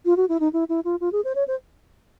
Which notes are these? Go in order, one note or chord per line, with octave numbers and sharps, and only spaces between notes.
F4
F#4
E4
D#4
E4
E4
F4
F4
G#4
C5
C#5
C5